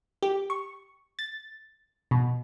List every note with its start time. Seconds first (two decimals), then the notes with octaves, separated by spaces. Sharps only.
0.23 G4
0.50 C#6
1.19 A6
2.11 B2